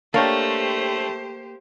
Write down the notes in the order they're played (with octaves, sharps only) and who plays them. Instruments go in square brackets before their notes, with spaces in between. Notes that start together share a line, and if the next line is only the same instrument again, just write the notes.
[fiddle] A3 [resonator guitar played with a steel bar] A#3 [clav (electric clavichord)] D4 C#5 G5 [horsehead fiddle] G4 C5